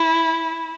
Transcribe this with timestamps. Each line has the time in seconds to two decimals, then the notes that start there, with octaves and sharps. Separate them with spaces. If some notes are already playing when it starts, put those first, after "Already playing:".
Already playing: E4